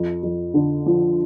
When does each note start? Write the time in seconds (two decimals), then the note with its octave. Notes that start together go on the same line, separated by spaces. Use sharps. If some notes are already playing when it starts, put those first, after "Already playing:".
Already playing: F2
0.23 F2
0.54 D3
0.86 F3